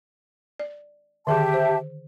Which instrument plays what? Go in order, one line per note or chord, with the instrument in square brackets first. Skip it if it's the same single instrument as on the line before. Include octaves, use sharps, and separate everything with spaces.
[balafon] D5
[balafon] D3 D#3 G#4 [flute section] G4 E5 A5
[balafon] C5